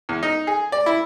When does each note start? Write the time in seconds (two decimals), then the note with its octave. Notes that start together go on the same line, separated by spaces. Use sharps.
0.09 E2
0.23 D#4
0.47 G#4
0.72 D5
0.86 E4